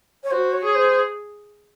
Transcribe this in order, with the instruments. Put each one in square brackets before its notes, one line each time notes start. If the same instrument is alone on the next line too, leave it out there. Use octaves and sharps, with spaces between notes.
[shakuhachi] C#5
[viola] F#4 [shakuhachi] C5
[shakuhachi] C#5
[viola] G#4
[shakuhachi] C5